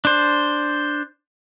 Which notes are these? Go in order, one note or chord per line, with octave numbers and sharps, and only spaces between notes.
D4 C5